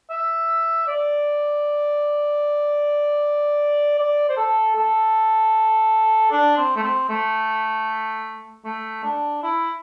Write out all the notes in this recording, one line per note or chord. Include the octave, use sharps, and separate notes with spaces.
E5
D5
D5
C5
A4
A4
D4
C4
A3
C4
A3
A3
D4
E4